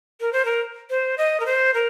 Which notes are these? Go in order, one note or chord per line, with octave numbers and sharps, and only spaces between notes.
A#4
C5
A#4
C5
D#5
A#4
C5
A#4